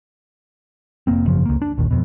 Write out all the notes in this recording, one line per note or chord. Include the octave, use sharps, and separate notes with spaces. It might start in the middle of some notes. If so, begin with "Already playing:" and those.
F1 A#3 C4
G#1 F#2 C#3 F3
C#2 A#3
D4
A#1 D#2
E1 F2 B2